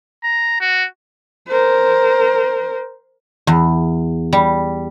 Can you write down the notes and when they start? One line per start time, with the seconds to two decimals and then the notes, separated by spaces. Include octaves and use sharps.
0.24 A#5
0.61 F#4
1.48 A#4 C5
3.47 E2
4.33 G3